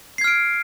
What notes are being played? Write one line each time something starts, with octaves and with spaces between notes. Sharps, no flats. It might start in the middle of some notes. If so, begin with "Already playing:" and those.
F6 G#6 C7 D7